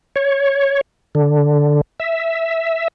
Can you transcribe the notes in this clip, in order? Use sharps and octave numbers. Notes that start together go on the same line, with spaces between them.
C#5
D3
E5